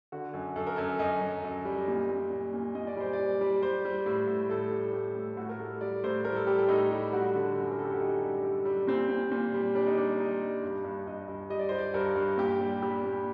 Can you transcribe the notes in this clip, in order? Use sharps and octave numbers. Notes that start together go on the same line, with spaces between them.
D3 F#4
F#2
F#2 A4
A#4
F#2 A4
F#2 D#5
F#2
F#2
G3
A#2
A#2
A#2
A#2
A#2 D#5
D5
G3 C5
D5
G3
G3
G3 C5
G3
A2
A2
A2 A4
G3
A2 G4
A2
A2 F#4
A#4
G3 A4
G3 D5
A2 C5
G3 A#4
A4
G3 G4
A4
A2 D#4
G3
G3 F#4
D3
F#2
A#4
G3 A4
G4
F#4
F#2 D#4
G3
G3
G3
A#2 C4
A#2
A#2
G3
G3 D4
D#4
G3 D4
G3 D#4
G3
G2
G2
G2 D#5
G2
G3 D#5
D5
G3 C5
D5
G2 A#4
G2
A#2 G4
G3
G3 G4
A#2